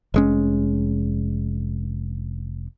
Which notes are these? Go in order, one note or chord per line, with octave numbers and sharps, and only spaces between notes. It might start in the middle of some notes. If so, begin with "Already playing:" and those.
F1 G#3 C#4